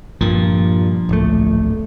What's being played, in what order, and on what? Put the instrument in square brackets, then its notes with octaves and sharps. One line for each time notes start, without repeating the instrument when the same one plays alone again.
[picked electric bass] G2 A#2 [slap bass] F3
[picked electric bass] D1 A#1 A3